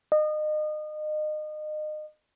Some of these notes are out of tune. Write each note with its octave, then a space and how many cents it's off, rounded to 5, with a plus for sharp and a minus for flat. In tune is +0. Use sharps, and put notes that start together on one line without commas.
D#5 -30